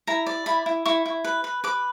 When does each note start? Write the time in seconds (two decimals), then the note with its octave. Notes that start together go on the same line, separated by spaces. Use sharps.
0.07 E4 A#5
0.26 D5
0.46 E4 B5
0.66 E4
0.86 E4 C#6
1.06 E4
1.24 B4
1.44 B4
1.64 B4 D6